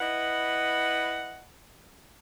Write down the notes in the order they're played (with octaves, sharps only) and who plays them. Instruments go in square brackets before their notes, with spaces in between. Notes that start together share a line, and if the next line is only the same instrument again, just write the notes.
[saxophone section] E4 B4 D#5 F#5